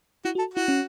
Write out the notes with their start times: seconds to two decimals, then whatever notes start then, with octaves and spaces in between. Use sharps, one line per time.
0.25 E4 F#4
0.35 F#4
0.39 A4
0.54 E4 F#4
0.68 C#4